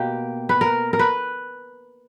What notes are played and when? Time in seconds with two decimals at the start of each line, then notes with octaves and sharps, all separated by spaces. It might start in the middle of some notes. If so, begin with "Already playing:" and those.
Already playing: B2 A#3 G4
0.49 B4
0.61 A#4
0.93 A#4
0.99 B4